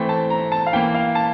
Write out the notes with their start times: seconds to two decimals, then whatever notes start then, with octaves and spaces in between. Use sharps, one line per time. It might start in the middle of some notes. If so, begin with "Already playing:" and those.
Already playing: E3 A3 C4 G5
0.09 A5
0.30 A#5
0.52 A5
0.67 F5
0.73 E3 A#3 G5
0.95 F5
1.15 A5